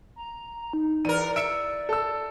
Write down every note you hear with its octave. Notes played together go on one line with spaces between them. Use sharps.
A#5
D#4
E2 A#4 D5 D#7
E5 C#7 D7
A4 E6